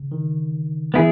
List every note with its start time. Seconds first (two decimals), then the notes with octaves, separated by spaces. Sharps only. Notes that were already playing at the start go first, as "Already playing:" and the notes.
Already playing: C#3
0.12 D#3
0.94 E3 B3 E4 G#4